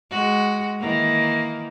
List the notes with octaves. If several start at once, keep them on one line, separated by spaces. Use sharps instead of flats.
G#3 F#4
D#3 E3 A#3